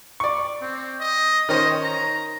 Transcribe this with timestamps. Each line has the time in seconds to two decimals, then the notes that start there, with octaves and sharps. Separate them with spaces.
0.20 D5 C#6
0.62 C4
1.00 D#5
1.49 D#3 C#4 C5 D#5
1.84 A#5